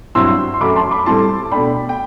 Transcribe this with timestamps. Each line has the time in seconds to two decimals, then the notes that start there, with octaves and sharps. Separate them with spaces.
0.15 G2 F#3 C4 E4 C6 E6
0.54 C6
0.61 F#2 F#3 A3 B5 D6
0.76 A5 C6
0.91 B5 D6
1.06 A2 G3 C4 E4 A5 C6
1.52 B2 A3 D4 G5 B5
1.89 G5